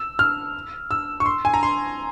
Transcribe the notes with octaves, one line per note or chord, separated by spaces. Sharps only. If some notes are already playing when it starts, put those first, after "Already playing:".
Already playing: E6
F6
E6
C#6
C6
G#5
A#5
C6